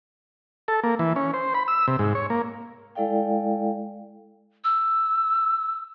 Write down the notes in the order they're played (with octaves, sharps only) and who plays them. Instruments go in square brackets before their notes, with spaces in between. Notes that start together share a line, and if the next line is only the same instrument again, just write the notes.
[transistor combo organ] A4
A#3
E3
C#4
C5
B5
E6
C3
G#2
C#5
A#3
[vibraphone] G#3 E4 A4 D5 F5 G5
[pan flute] E6